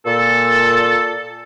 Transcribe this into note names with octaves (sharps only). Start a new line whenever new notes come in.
A#2 A4